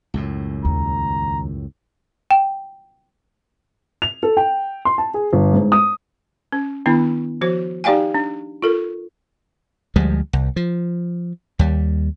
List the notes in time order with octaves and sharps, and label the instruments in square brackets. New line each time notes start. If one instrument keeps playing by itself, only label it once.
[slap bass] C#2 F#2 A2
[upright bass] D#2 [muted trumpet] A#5
[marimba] G5
[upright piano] F7
A4
G5
C6
A5
G#4
G1
G#2
D#6
[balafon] C#4
D#3 B3 D4 E4
F3 F#4 C5
D#4 G4 D5 F5 G5 G#5
D4
F4 A4 A#4
[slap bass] D2 F3 G3 G#3
C2
F3
D#2 G3